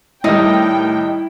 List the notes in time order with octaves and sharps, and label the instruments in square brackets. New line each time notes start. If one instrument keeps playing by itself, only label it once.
[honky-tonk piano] A2 D#3 G3 [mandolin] D#4 [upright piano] E4 [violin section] G5